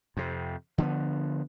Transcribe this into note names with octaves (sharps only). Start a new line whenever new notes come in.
F2 C3
D3 F3 A3 B3